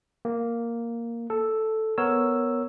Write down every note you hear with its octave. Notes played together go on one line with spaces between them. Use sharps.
A#3
A4
B3 A#4 C#5 E6